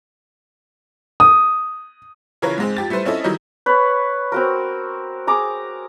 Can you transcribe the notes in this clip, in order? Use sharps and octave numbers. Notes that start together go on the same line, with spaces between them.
D#6
C#3 E3 F3 A#4 B4 C#5
G#2 G#3 C4
F2 G4 A6
G3 A3 E4 B4 C5
C4 C#4 E4 A4 D#5
D#3 E3 F#3 G3 D#4
B4 C#5
C4 F#4 A#4
G#4 A#5 D6